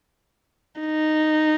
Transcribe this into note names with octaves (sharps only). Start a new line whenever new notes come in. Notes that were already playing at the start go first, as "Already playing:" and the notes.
D#4